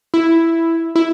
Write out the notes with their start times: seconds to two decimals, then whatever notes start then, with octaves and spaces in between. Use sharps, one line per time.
0.14 E4
0.96 E4